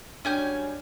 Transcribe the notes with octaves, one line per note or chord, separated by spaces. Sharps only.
F#3 G3 C#4 D4 G5 G#5 G6